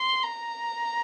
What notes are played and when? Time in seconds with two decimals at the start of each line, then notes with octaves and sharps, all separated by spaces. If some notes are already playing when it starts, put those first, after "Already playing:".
Already playing: C6
0.23 A#5